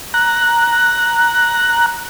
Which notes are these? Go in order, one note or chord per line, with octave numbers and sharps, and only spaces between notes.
A#5 F#6